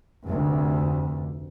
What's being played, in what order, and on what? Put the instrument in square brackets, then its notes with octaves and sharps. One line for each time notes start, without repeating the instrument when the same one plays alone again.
[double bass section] F1 D2